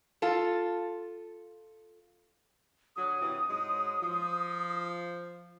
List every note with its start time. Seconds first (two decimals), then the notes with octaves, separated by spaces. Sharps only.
0.22 F4 A4
2.96 D3 F#3 D#6
3.20 G2 C3 E3
3.48 G#2 F#3 G#3
4.01 F3